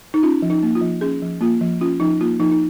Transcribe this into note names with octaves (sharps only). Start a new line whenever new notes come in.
D#4
C#4 F4
F3
D#4
A#3
F4
F3
C#4 G#4
F3
A#3 F4
F3
C#4 F4
F3 D#4
A#3 F4
F3 D#4
D#4